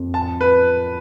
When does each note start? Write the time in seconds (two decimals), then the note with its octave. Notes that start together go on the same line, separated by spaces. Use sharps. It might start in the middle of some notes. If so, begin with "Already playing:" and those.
Already playing: F2
0.14 A5
0.41 B4